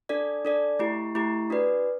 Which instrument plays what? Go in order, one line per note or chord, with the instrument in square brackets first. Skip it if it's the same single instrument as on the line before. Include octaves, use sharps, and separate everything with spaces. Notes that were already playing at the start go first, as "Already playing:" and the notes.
[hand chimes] D4 A4 D5
D4 A4 D5
A3 E4 G4
A3 E4 G4
D4 F#4 B4 D5